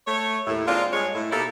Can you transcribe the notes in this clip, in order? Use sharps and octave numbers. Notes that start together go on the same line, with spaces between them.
A3 C#5
D#2 A2
G#3 A#3 C4 D4 F4
G2 G#3 C#5
A2
B2 A#3 D#4 E4 G4 A4